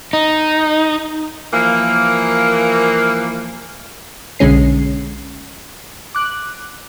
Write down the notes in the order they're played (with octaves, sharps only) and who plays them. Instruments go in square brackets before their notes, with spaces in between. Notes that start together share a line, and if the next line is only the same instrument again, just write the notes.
[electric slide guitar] D#4
[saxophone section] E3 F3 A#3
[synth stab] B1 D3 G#3 C#4 C7
D6 F#6